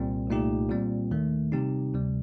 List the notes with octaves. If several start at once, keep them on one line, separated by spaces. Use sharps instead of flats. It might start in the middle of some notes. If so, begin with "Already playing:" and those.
Already playing: C2 A#2 G3 C4
C2 A#2 A3 D#4 G4
A#2 G3 C4
D#2 D#3 A3
C3 G3 C4 D#4 G4
D2 C3 G3